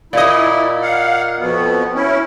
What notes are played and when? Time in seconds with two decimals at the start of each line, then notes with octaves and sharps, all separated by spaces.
0.13 A#2 E4 D#5
0.82 F5 F#5
1.39 F2 B2 B3
1.95 C#4 E4